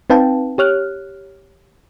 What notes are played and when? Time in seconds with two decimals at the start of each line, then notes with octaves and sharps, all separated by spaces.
0.10 C4 D#4 B4 F5 G5 A5
0.58 G4 C#5 F6 F#6